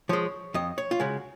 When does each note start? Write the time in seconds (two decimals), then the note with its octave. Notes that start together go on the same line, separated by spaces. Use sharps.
0.09 F3 G#3 C#5
0.54 F2 D#5
0.78 C#5
0.91 F4
1.00 C#3 G#3 F#4